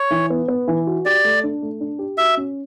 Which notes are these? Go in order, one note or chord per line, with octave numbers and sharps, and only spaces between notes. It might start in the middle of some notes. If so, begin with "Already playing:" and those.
Already playing: C#5
E3
B3
B3
E3
F#4
G4 D5
A3
D4
A3
D4
G4
F#4 E5
C#4